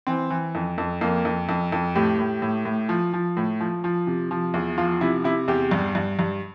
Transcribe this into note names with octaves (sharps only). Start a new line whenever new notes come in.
E3 C4
E3
F2
F2
F2 A#3
F2
F2
F2
A2 G4
A2
A2
A2
F3
F3
A2
F3
F3
C3
F3
E2
F3 F4
C3 E4
C3 E4
E2 G4
G2
G2
G2